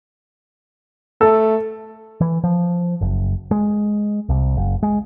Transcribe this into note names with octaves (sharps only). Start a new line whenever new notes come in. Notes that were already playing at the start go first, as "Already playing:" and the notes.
A3 A4
E3
F3
F#1
G#3
C2
F#1
G#3